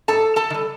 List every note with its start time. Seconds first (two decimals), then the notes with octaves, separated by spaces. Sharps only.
0.08 G#2 A4 A5
0.36 A4 A5
0.50 D#3
0.54 G3